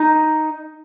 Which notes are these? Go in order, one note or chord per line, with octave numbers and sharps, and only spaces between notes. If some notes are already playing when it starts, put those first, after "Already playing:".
Already playing: D#4